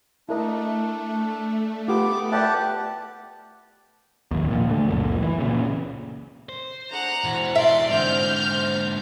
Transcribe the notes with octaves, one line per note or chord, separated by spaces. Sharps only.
A3 D4 E4 A#4 D#5
B3 F4 G4 D6
G4 B4 D5 E5 F#5 A5
D1 D#2
A#2 F3
D3 A3
C#2 F#2 A#2
E3
A#2 C#3
C5
A3 D4 G#4 F#5 A#5
B2 E3 F#4 C5
D5 E5 C6
G#2 D3 C4 F6 G6
C4